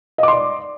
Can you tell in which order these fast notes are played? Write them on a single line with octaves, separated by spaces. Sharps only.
D#5 D6 C6 D5